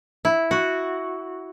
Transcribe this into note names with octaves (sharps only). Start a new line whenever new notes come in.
E4
F#4